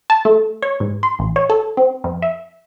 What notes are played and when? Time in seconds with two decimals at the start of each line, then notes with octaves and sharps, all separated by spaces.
0.10 A5
0.25 A3
0.62 C#5
0.80 G#2
1.03 C6
1.19 A1
1.36 C#5
1.50 A4
1.77 C4
2.04 F2
2.22 E5